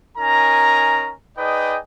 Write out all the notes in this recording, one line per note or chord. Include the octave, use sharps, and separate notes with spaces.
C#4 D#4 A#4 G#5 A#5
D#4 G#4 B4 D5 D#5 G5